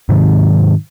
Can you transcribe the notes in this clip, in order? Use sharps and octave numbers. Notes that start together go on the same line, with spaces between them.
G#2 C3 D#3 F#3